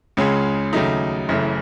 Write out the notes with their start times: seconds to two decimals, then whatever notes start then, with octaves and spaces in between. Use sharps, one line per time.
0.17 C#2 C#3 G#3 C#4 G#4
0.73 D#2 C#3 F#3 A3 D#4
1.29 F#1 F#2 C#3 E3 A3